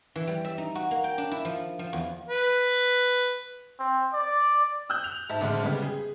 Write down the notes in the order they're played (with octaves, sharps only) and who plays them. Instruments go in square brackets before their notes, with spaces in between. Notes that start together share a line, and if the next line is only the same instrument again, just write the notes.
[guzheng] E3
G3
E5
D#4
F#4
A#3
G5
D4
E4
F3
F3
E2
[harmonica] B4
[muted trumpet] C4
D5
[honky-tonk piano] D#6 E6 F#6 G6
F7
G#2 E5 A5
A1 D3 G#3 C5 E5 F6
C#3 G3 G#3 B3
G#4